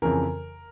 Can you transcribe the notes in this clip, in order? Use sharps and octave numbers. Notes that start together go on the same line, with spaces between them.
F2 C#3 E3 A#4